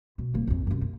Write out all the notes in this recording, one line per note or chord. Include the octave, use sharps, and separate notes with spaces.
B2
D#1 A#3
A#1 F2
F#2 C3
A#3